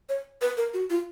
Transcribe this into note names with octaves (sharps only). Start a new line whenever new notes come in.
C#5
B4
A#4
F#4
F4